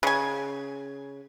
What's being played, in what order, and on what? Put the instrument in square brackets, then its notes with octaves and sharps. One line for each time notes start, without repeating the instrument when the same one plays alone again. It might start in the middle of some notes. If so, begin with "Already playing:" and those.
[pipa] C#3 G#5